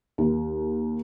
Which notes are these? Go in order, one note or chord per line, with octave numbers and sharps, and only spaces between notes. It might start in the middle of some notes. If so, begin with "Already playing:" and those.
D#2